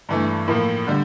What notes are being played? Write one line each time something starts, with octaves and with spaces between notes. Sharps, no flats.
G2 E3 A3
A2 F3 A#3
D3 G3